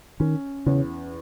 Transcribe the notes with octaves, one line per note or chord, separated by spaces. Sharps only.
D#3 C#4
E2 C#3